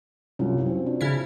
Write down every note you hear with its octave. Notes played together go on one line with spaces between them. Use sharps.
C2 F#2 C#4 F4 F#4
C4
D4 F4
C#3 E4